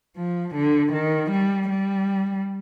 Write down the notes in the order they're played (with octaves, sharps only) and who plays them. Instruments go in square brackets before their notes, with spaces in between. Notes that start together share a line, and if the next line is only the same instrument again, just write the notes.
[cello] F3
D3
D#3
G3
G3